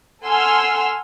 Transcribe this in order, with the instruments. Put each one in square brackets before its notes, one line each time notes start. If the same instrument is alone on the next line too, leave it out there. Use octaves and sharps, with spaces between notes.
[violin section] A4 F#5 G#5 C6 E6 F6